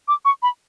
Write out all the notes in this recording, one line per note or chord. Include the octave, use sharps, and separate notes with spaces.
D6
C#6
B5